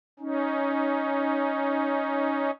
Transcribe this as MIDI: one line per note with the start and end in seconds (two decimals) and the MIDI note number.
0.19 2.51 61
0.19 2.51 63